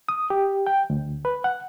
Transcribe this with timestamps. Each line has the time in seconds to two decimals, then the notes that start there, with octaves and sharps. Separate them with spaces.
0.09 D#6
0.30 G4
0.67 G5
0.90 D2
1.25 B4
1.44 F#5